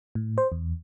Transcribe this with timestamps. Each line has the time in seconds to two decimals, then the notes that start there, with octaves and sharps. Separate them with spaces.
0.15 A2
0.38 C5
0.52 E2